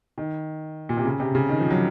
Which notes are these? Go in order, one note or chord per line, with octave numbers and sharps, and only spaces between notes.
D#3
A#2
C3
C#3
C3
C#3
D#3
F3
F#3